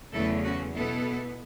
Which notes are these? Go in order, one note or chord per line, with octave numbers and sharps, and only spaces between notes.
E2 C#3 F#3 A3 E4 A4
C#4 F#4
B2 B3 E4 A4